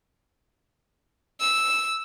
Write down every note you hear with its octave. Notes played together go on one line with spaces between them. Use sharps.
E6